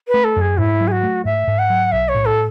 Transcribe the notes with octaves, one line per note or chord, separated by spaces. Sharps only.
B4
A3
A4
F#2 G#4
G#2 E4
F#3
G#4
F#4
A3
G#2 E5
G#2
F#5
F#3
B1 E5
C#5
A2
A4